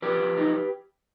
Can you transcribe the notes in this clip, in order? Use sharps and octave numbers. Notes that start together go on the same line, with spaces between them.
F3 G4 B4
F3
D#4